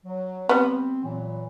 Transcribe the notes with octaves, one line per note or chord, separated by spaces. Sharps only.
F#3
G3 B3 C4
A#2 E3 F#3